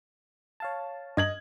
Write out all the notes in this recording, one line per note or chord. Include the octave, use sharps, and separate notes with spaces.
C#5 F5 A5
G2 D#5 G#6 F#7